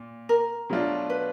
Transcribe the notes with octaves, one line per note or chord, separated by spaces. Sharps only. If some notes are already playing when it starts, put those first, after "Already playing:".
Already playing: A#2
A#4
B2 F#3 A3 D4 F4
B4